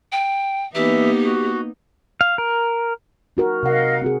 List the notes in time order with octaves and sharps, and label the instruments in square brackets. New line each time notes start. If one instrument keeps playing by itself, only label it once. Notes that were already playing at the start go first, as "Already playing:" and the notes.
[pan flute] G5
[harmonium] E3 E5 [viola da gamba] A#3 B3 D#4 [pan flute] G4
[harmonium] F#4
[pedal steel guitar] F5
A#4
[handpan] D#4 F#4 A#4
[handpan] C3 F#5 [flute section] A#4 D#5 F5
[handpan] C4 F#4 G#4